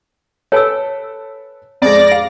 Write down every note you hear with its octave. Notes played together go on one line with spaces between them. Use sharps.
A4 B4 C#5 G#5 E6
F2 G#3 D5 A#6
F5